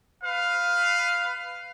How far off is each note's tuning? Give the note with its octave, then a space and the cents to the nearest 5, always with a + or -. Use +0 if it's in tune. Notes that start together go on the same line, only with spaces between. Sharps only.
B4 +20 F5 +5